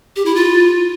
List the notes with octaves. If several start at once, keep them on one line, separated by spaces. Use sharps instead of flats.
G4
E4
F4